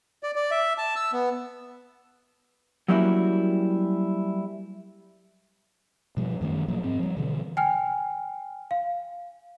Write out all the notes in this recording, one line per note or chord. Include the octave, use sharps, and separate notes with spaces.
D5
D5
E5
A5
E6
B3
F#3 G3 A#3 C#4 E4 F#4
B2 F3 G3
F#2 D#3 A3 C#4
B2 F3 F#3 A#3
G#2 C4
F3 G3
B2 D3 E3
G5 G#5 F6
F5